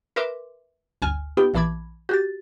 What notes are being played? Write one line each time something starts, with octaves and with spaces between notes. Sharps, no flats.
A#4 B4 E5 C6 D6
G1 D2 G#5 F6
B3 D#4 F4 G4 G5
A#1 E3 A5 B5 D6 G#6
F#4 G4 A6